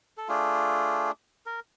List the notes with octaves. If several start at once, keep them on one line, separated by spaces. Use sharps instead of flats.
A4
A3 D4 F4 G#4
A#4